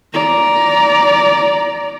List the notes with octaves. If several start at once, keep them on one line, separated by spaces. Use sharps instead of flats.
D5 A#5